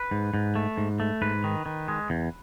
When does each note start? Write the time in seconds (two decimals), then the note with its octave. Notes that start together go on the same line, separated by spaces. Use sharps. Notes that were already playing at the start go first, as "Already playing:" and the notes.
Already playing: B4
0.11 G#2
0.34 G#2
0.56 A3
0.78 G#2
1.00 A3
1.22 G#2 B4
1.44 D#3
1.66 D#3
1.88 G#3
2.10 E2